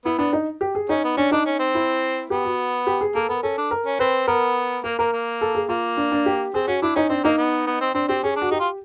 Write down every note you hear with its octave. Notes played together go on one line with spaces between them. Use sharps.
B3 E4
B3 D4
D#4
G4
G#4
C#4 D#4
B3
C#4 D4
D4 D#4
C#4
C4
E4
B3 G4
F#4
G4
G#4
A#3 A4
B3 A#4
C#4 A4
D4
A#4
C#4
C4 B4
B3 A#4
A#3 A#4
A#3 A#4
A#3
A4
G#4
A#3 F4
D4
D4
G4
C4 G#4
C#4 F#4
D4 E4
C#4 D#4
C4 D4
A#3 D#4
B3
B3
C4
C4 D4
C4 G4
C#4 G#4
D4
F#4
D#4 G4
F4